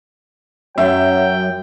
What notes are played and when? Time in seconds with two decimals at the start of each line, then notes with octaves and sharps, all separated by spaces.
0.78 F#2 F#3 E5 G5